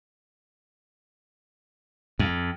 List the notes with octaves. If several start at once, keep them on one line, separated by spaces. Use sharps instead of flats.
F2